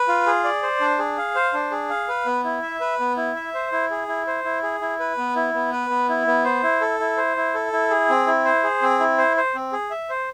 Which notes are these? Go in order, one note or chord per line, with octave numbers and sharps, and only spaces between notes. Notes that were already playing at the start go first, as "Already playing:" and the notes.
Already playing: B4
F4
G#4
D5
C5
D4
G#4
F5
C5
D4
G#4
F5
B4
B3
E4
E5
B4
B3
E4
E5
C5
E4
G#4
E4
C5
E4
G#4
E4
B4
B3
E4
B3
B4
B3
E4
B3
C5
E4
A4
E4
C5
E4
A4
E4
G#4
C4
E4
C5
G#4
C4
E4
C5
C5
C4
G#4
E5
C5